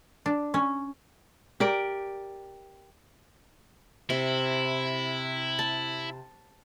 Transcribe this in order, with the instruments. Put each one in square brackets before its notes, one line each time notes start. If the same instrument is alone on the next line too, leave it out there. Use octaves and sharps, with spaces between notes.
[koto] D4
C#4
[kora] G4 A#4 D5
[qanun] C3 [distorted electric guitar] E4
[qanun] A5